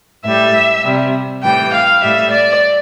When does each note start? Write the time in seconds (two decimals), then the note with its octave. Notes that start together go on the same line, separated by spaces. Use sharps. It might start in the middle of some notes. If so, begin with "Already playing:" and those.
0.24 A2 G3 E5
0.84 C3 G3
1.43 A2 E3 G3 G5
1.72 F5
2.02 A2 G3 E5
2.31 D5